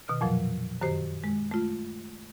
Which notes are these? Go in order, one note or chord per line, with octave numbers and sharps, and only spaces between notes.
B2 D#3 F6
F2 A#2 F3 F#3
F#2 D#3 G4 C5
G#3
A3 F4